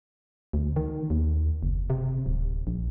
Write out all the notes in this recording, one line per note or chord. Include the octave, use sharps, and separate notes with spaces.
D2
D#3
D#2
F#1
C3
D1
A#1